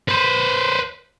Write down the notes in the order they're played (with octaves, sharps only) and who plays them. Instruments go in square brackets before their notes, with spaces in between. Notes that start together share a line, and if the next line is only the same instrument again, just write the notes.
[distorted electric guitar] B4 C5